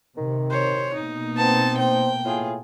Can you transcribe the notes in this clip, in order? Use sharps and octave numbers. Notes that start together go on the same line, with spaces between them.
C3 D#3
C5 C#5
B2 A#3 D#4
B3 C4 A5
C5 G5
A2 F4 G#4